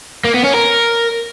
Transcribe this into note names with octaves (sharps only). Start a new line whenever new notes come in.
A#3
B3
C#4
A#4